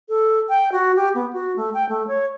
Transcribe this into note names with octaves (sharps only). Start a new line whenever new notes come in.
A4
G5
F#4
G4
B3
F#4
A3
G5
A3
C#5